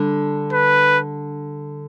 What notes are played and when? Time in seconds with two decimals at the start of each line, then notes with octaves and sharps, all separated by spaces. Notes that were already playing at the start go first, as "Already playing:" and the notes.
Already playing: D3 G3 D4
0.53 B4